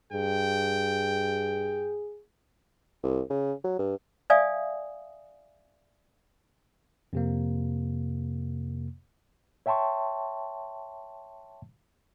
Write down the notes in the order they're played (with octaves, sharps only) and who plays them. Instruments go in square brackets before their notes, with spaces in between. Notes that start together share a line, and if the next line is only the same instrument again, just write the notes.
[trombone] G2 [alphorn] G#4 [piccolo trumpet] G5
[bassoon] C2
C#3
F#3
G2
[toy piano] D5 E5 F5 G#5 D#6
[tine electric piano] F2 C3 A#3
[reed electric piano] C#5 E5 G5 A5 C6 C#6